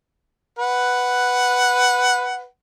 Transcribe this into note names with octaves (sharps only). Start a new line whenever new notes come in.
B4 F#5